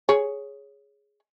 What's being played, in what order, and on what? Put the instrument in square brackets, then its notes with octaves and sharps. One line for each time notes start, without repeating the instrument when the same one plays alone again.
[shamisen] G#4 C#5